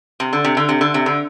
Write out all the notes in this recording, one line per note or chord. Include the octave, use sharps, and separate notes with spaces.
C3
D3
C3
D3
C3
D3
C3
D3